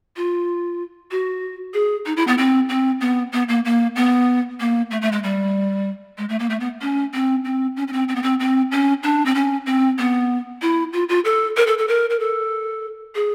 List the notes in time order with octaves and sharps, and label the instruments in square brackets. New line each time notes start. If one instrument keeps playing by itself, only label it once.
[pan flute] F4
F#4
G#4
D#4
E4
B3
C4
C4
B3
B3
A#3
A#3
B3
A#3
A3
A3
G#3
G3
G#3
A3
A#3
A3
B3
C#4
C4
C4
C#4
C#4
C4
C4
B3
C4
C4
C#4
D4
C4
C#4
C4
B3
E4
F4
F4
A4
A#4
A4
A4
A#4
A#4
A4
G#4